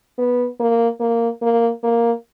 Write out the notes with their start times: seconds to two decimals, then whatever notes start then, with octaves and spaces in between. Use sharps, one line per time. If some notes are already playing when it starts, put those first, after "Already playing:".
0.18 B3
0.60 A#3
1.00 A#3
1.42 A#3
1.83 A#3